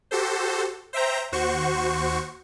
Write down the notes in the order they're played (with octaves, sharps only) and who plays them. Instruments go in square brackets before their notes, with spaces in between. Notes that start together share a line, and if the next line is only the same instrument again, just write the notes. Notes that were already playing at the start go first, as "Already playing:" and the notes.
[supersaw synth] F#4 G4 A4 C5
C5 E5 G5 A#5
D#2 F#4 C5 C#6